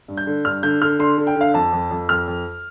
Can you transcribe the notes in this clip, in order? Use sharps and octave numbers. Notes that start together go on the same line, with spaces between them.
G2
G6
D3
G2 F6
D3 G6
D3 F6
D3 C6
D3
G5
D3
F5
F2 A5
F2
F2
F2 F6
F2